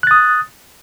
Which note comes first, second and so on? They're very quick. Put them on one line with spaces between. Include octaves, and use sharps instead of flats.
F#6 A6 D#6